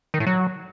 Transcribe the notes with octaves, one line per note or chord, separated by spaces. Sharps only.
D#3
A2
F#3